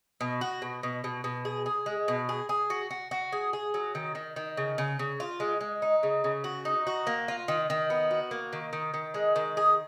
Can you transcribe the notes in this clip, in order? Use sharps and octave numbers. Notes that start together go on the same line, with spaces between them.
B2
F#4
B2
B2
B2
B2
G#4
G#4
G#3
B2
G#4
G#4
F#4
F#4
F#4
G#4
G#4
F#3
D#3
D#3
D#3
C#3
C#3
C#3
F4
G#3
G#3
D#4
C#3
C#3
F#4
D#4
F#4
A#3
F4
D#3
D#3
B3
F#4
A#3
D#3
D#3
D#3
G#3
D#3
G#4